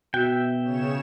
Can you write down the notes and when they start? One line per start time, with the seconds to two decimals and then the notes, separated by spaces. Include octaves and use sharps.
0.14 B2 F#4 E5 G5
0.63 C#3 C#5 E7